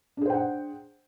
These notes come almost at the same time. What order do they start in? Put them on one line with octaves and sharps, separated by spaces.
D4 G#4 C5 G5 F#5